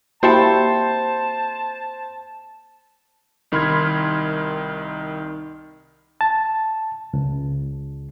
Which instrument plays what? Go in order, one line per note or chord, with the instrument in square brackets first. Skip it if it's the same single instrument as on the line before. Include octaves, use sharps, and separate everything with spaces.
[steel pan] A#3 F#4 G4 [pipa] C4 E4 A4 [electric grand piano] C5 [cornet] A5
[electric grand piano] C2 D#3 B5 C6 F6 G#6
[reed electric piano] A5
C#2